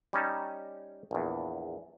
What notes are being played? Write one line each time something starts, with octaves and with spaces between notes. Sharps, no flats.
G3 C#4 D#4 A5
A#1 E2